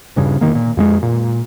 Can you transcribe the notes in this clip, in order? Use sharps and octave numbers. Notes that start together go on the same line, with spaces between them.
D#1 G2 C#3
E1 D#3 A#3
A#2
F2 G3 G#3
A#2